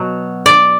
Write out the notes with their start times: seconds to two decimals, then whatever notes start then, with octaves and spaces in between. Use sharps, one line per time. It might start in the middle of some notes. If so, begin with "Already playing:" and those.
Already playing: B2 F#3
0.46 D5